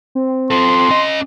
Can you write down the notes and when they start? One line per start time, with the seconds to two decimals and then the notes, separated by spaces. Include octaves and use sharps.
0.15 C4
0.51 F4 A4 C6
0.89 C#4 D#5